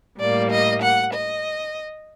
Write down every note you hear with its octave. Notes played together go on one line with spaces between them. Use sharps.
A2 G3 A#3 D5
D#5
F#5
D#5